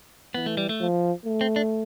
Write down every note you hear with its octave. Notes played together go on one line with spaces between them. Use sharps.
E3 B3
A3
G3
A3
F3
A3
C4
D4